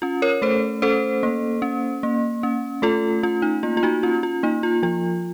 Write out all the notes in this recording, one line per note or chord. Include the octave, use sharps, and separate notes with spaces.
C#4 F4
A#4 C#5
A3 A4 C5
C#4 A4 C5
A#3
C#4
A#3
C#4
A3 F4 A4
C#4 F4
D#4
A#3 F4
F4
D#4 F#4
C#4 F4
F4
A#3 D#4
F4
F3 F4